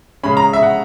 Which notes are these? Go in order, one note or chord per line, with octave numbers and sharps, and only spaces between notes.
C#3 G#3 C#4 B5
A#5
E5
F#5